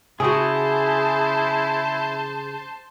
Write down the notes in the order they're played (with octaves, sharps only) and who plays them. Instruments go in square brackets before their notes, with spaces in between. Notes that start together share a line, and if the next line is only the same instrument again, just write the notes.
[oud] C#3 F#4 [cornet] E4 [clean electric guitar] G#4 [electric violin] C5 A5